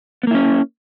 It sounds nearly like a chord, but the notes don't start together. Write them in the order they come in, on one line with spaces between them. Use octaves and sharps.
B3 A#3 E4 C#4